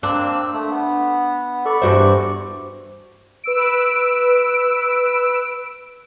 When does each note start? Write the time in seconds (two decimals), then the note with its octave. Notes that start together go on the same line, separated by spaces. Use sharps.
0.03 A#3 C4 D4 E6
0.54 A3
0.71 B3
1.66 A4 D5 B5 C#6
1.82 E2 G2 F#4 C5 E5
3.44 B4 E6 D7